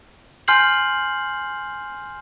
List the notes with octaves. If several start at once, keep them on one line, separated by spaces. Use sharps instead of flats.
G#5 C6 F6 G6 C7 F#7